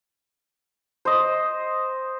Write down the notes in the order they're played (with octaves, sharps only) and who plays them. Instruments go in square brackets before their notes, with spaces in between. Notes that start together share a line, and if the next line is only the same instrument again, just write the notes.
[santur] C5 D#5